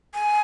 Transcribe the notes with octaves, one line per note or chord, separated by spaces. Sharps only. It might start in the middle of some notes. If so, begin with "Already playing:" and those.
G#5